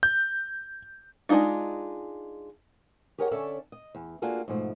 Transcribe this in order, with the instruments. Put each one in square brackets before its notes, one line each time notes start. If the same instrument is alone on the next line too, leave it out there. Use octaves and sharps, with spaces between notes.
[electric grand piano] G6
[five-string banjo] G#3 A#3 D4 D#4 F4
[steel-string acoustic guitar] G4 G#4 A#4 C#5 D#5 F#5
D3 C#4 A4 C#5 D5 E5
D#5
E2
A#3 D4 F4 F#4 G#4 A4
G#2 B2 F3 A3